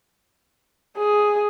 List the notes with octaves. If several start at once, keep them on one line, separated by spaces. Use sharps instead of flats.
G#4